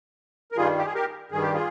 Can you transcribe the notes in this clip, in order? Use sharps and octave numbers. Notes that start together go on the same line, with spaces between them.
A#4
G2 D#3 G3 F4 G#4
G4
G#4
G4 A#4
G2 D#3 G3 G#4
G4
F4 G#4